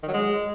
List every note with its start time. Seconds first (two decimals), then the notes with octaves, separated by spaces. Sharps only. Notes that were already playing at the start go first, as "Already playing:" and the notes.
0.03 D#3
0.08 F#3
0.13 G#3